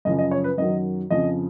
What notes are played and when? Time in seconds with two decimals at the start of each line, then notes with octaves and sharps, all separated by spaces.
0.05 F#2 C#3 F3 D#5
0.18 D#5
0.31 C#5
0.44 B4
0.58 F#2 D#3 F#3 D#5
1.10 F2 C#3 F3 D#5